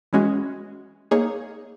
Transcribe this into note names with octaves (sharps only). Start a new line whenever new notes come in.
E3 G#3 C#4 F#4
A#3 D#4 G#4 C#5